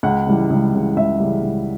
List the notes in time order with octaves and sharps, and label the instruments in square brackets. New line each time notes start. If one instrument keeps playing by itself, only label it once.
[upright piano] C#2 F#5
C#3 E3 G3
C#2
C#3 E3 G3
C#2 E5
C#3 E3 G3
C#2